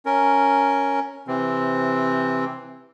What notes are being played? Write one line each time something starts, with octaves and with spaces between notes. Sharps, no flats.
C#4 A#4
C3 E3 C4